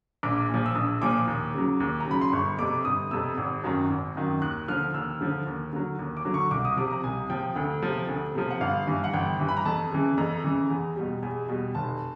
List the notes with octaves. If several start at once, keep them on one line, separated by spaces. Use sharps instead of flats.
A#1 D6
A#2 F3
E6
A#1 D#6
A#2 F3 D6
D#2
C#3 F#3
D#2
A#5
C#3 F#3 B5
C6
G1 C#6
F2 C3 D6
G1 D#6
F2 C3 E6
G#1
F#2 D#3 F#3
G#1
F#2 D#3 F#3
D#2 F#6
D3 F3 F6
D#2 E6
D3 F3
D#2
D3 F#3
D#2
D6
D3 F#3
C#6
C2 D6
D#6
C3 F3 D6
A#5
C2 G#5
C3 F3 G5
D2
C3 F3
D2
C3 F3
F#5
G1 F5
G2 E3
F#5
G1 G5
G2 E3
B5
A#5
F2 A5
C#3 E3
F2 A#5
C#3 E3
E2
B2 G3
E2
B2 G3
F1 A5